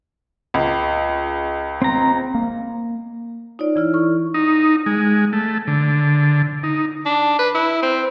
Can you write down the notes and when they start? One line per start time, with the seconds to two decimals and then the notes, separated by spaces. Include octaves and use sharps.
0.54 C#2
1.82 C4 A#5
2.35 A#3
3.59 D#4 F4 C#5 D5
3.76 E3 E4 F6
3.93 A4 C#6 F6
4.34 D#4
4.86 G#3
5.33 A3
5.67 D3
6.63 D#4
7.05 D4
7.39 B4
7.54 E4
7.83 C4